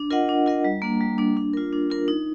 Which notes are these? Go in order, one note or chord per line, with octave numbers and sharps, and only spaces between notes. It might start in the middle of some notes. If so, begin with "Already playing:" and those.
Already playing: D4
F4 A#4 D#5 F#5
D4
F4 A#4 D#5 F#5
G3
A#3 D4
G3
A#3 D4
D4
F4 A#4
D4
F4 A#4
D#4